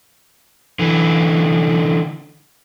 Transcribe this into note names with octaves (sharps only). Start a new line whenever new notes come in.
D3 E3